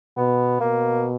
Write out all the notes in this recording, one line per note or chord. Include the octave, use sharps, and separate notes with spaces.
B2 B3
B2 A#3